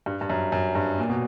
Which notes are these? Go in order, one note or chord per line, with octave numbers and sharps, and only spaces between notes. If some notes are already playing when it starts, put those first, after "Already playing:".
G2
G2
F#2
F#2
G2
A#2
B2